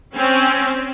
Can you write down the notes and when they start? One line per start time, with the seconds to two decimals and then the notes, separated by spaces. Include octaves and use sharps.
0.16 C4 C#4